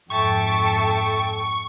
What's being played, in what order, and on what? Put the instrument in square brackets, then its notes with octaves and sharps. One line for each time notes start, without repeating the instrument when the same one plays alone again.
[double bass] F2 G#2 [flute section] A4 G5 [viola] E5 A5 [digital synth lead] C#6